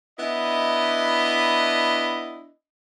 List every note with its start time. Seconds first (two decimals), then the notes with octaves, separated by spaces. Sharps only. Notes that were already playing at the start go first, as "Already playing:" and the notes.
0.18 B3 D4 E4 D#5